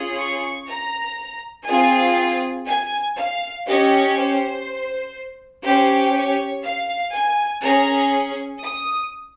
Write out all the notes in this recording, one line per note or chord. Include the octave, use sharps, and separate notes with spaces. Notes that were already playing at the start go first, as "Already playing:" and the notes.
Already playing: C#4 F4 G#4
C#6
A#5
C4 F4 G#4 G#5
G#5
F5
C#4 G4 D#5
C5
C#4 G4 C5
C#5
F5
G#5
C#4 G#4 A#5
D#6